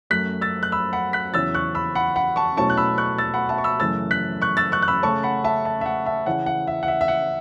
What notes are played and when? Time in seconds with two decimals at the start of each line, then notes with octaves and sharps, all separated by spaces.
0.10 F#2 F#3 A3 F#6 B6
0.41 E6 A6
0.63 F#6
0.72 B5 E6
0.93 F#5 B5
1.13 F#6 B6
1.34 E2 C#3 F#3 C#4 E4 E6 A6
1.54 C#6 F#6
1.75 B5 E6
1.95 F#5 B5
2.16 F#5 B5
2.36 A5 C#6
2.57 B2 F#3 A3 C#4 E4 A5 C#6
2.70 F#6
2.77 B5 E6
2.98 C#6 F#6
3.18 E6 A6
3.34 F#5 B5
3.49 E5 A5
3.58 C#6
3.64 B5 E6
3.80 F#2 C#3 E3 A3 C#4 E6 A6
4.11 F#6 B6
4.42 C#6 F#6
4.57 E6 A6
4.72 C#6 F#6
4.82 F#6
4.88 B5 E6
5.03 C#3 A3 C#4 A5 C#6
5.23 F#5 B5
5.44 E5 A5
5.65 E5 A5
5.81 E5
5.86 F#5
6.06 E5 A5
6.26 C#3 E3 C#4 E4 F#5
6.46 F#5
6.67 E5
6.83 F#5
6.88 E5
7.01 E5
7.08 F#5